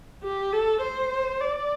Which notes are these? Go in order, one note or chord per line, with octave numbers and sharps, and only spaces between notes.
G4
A4
C5
D5